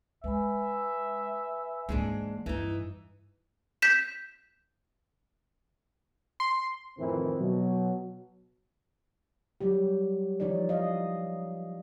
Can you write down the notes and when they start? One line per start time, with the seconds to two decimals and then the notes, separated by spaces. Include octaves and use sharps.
0.24 G#3 B4 E5 G#5 B5
1.89 G#2 E3 G#3 A#3 D4
2.46 G2 E3 D#4
3.82 G6 B6 E7
6.40 C6
6.99 F2 A2 D#3 E3 C4 E4
7.40 B2 F#3
9.61 F#3 G3 G4
10.40 E3 F3 D#4 C#5 D5
10.69 D#5 F5